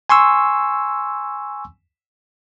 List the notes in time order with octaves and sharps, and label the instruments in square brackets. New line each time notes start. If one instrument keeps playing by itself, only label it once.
[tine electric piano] G#5 C6 C#6 E6